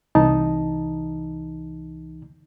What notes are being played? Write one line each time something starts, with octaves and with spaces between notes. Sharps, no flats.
C2 E3 D#4 A5